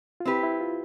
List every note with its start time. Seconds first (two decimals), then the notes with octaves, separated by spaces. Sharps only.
0.20 F4
0.25 C4 E4 G4 B4
0.43 E4
0.61 F4